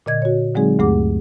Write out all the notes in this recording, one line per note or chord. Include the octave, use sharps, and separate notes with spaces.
A#2 D3 D#5 G#6
F#4 C#5
D3 F#3 G#3 C4 D#4 G#4
D2 G2 A3 G#4 F#5 D6